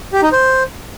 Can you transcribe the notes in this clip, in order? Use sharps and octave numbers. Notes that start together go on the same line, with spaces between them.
G4
D#4
C5